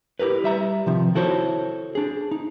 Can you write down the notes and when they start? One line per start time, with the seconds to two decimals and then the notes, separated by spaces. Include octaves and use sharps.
0.19 E4 G4 G#4 A#4 B4
0.44 G3 E5 A#5
0.86 C3 D#3 F3
1.15 E4 F#4 A4 C5 C#5
1.95 D4 G#4
2.31 D#4